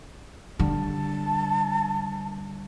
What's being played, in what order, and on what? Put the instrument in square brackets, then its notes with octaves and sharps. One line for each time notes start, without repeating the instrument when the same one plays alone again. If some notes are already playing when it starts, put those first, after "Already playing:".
[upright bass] D3 G3 [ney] A5